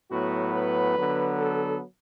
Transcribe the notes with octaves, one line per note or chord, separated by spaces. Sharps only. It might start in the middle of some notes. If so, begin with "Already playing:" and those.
A2 F#3 B3 F#4
B4
D3 F#3 B3
A4